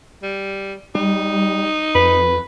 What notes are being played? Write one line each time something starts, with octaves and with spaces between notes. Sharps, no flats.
G3
G3 D#4
F2 B4